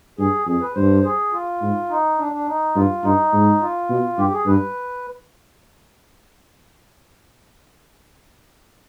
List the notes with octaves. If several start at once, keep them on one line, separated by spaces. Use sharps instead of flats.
G2 G#4
F2 G#4
B4
G2 C5
G#4
F4
G#2
D#4
D4
D4
D#4
G2 F4
G2 D#4
G#2
F4
B2
G2 G4
G#4
G2 B4